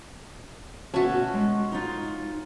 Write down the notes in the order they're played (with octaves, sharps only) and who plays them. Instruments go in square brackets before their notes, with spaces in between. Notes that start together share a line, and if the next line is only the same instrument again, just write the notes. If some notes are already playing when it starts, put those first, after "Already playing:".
[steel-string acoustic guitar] B2 E5 A5 [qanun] C#4 F#4
[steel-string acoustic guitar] G#3
D#4 F4